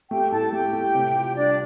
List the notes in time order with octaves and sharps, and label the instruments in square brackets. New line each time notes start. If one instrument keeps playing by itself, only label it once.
[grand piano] A3 [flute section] G4 G5
[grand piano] A2 [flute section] A4 A5
[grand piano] A3 [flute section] G4 G5
[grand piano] A3
C3
F4
[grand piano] G3 [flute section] D4 D5